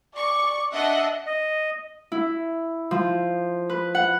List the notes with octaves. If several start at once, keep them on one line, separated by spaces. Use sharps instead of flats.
D5 C#6
D4 D#5 E5 F#5
D#5
E4
F3
B4
F#5